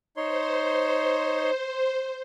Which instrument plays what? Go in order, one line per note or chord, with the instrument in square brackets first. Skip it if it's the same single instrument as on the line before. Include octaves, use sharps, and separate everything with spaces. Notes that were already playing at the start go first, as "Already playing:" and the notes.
[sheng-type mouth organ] D#4 C#5 C6 [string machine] C5